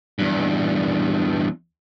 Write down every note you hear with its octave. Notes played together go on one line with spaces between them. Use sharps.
E2 G2